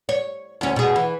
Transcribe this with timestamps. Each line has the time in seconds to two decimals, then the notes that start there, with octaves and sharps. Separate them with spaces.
0.09 C#5
0.61 D2 C#4
0.76 B2 G#4
0.96 E3